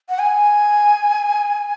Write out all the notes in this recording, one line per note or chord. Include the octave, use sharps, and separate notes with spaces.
F#5
G#5